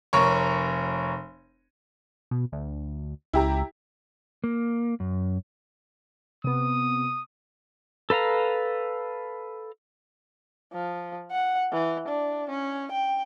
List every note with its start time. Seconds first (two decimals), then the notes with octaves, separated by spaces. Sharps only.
0.13 F1 A#4 C#5 C#6
2.31 B2
2.52 D2
3.33 C#2 E4 G4 A#5
4.44 A#3
5.00 F#2
6.44 C3 B3 D#6
8.10 A4 B4 F5 A#5
10.73 F3
11.32 F#5
11.72 E3
12.08 D4
12.49 C#4
12.92 G5